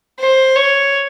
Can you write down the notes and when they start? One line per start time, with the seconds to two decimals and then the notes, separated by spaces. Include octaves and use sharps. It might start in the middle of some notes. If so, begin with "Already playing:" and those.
0.19 C5
0.56 C#5